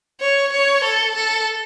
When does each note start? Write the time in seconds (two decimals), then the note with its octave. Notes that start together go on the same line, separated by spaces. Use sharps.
0.21 C#5
0.52 C#5
0.84 A4
1.15 A4